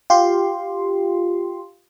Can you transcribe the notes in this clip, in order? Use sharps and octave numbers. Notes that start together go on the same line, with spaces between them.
F4 G4 C6